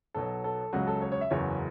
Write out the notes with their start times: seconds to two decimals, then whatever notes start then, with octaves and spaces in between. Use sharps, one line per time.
0.15 B1 B2 F#3 A4
0.44 A4
0.73 C#2 C#3 F#3 F#4
0.87 A4
1.02 C#5
1.12 C#5
1.21 E5
1.30 F#1 E2 C#3 F#3 C#5